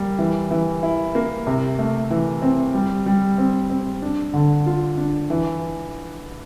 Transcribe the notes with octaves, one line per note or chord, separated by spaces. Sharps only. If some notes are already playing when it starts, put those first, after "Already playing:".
Already playing: G3 A#3
E3
E3
E4
A#3
C3
A3
E3
C4
G3
G3
C4
C4
D4
D3
F4
D4
E3